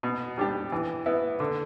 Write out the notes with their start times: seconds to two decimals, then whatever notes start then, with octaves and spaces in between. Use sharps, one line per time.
0.03 B2
0.38 G3 D4 G4
0.72 E3
1.06 B3 E4
1.40 D3